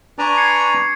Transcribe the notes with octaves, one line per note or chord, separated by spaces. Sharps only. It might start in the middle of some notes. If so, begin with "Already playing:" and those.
D4 B4 G#5 A#5 C#6 D6
G#6 C7 C#7